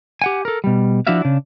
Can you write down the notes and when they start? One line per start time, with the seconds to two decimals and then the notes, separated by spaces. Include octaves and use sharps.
0.22 G4 F#5 G#5
0.45 A4 A#4
0.64 B2 G3
1.07 F3 D4 E4 F#4 E5 F5
1.22 C#3 D4